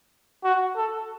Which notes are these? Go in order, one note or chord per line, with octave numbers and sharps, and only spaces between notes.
F#4
A4